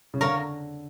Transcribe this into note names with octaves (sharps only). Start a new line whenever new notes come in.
C#3
D3 A#4 C#5 F5